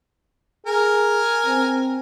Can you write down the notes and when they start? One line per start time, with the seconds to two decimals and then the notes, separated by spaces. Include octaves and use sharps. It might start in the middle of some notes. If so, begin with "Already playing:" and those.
0.66 G#4 A#4 G#5
1.46 C4